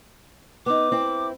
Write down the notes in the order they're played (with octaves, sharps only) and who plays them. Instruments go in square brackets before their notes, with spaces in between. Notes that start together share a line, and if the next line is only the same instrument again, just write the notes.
[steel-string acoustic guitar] B3 D#4 [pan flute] D6
[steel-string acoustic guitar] C4 E4